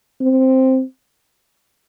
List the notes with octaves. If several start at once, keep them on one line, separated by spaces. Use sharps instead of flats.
C4